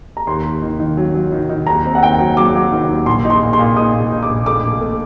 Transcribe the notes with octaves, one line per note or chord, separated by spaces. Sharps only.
A#5
D#2 C6
D#2
D#3
D#3
F#3
F#3
D#3
D#3
D#2 A#5
C4
F#5
D#2 G5
F#3
F#3 D6
F#3
D#3
D#2
A#1 C6
D#4
C6
A#2
C6
A#2
D#4 D#6
A#2
D#4
D6
A#1
A3 D6
A#1
A3